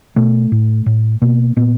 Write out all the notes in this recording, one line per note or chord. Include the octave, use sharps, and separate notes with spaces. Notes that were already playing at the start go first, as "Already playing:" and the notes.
B2 A3
A2
A2
B2 A#3
A#2 B3